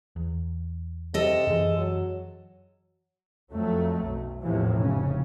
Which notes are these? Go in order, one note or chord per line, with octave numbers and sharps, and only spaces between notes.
E2
C3 A4 D#5
F#2 E3 G#3
F#3
F2 F#3 A3
B1
E2 A2 C3 E3 F3
F1 C#3 C#4